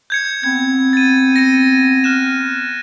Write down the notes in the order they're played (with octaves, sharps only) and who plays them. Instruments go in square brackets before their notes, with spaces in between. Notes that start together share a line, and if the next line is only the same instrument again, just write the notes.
[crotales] G6 G#6 C#7
[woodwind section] B3 C4 [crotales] G#6
[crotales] A6 D#7
A#6 C#7 D#7
F6 F#6 E7